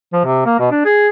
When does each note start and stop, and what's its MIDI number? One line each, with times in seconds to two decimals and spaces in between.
0.13 0.21 53
0.25 0.42 48
0.46 0.55 58
0.60 0.67 47
0.71 0.81 62
0.85 1.08 68